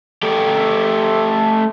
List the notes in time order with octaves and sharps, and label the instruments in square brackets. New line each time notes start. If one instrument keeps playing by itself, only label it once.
[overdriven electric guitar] A3 G4